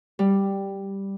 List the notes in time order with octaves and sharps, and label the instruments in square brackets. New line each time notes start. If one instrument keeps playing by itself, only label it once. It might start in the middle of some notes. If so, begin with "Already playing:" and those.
[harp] G3